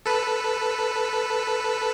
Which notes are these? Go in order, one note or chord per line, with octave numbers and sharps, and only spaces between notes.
A4 B4